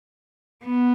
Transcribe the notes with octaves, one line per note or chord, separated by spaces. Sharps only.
B3